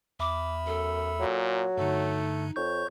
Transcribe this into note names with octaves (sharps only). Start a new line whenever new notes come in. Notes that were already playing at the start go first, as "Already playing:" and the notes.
E2 E5 B5 D6
F#2 A4
A#2 F#3
G2 D3 A3 D#4
F2 C#5 C#6 G6